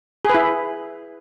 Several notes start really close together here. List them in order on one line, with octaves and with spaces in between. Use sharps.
G#4 B4 E4